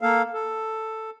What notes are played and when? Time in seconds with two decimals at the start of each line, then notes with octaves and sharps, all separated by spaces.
0.01 A#3 A4 F5
0.34 A4